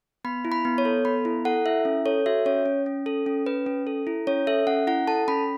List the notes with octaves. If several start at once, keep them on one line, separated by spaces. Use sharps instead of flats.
B3 B5
E4
B5
B3
C#5
A4
B3 B5
E4
A4 F#5
E4 E5
C#4
A4 C#5
F#4 E5
C#4 C#5
C#4
C#4
A4
C#4
C#4 B4
C#4
A4
E4
C#4 C#5
A4 E5
C#4 F#5
E4 F#5
A4 A5
C#4 B5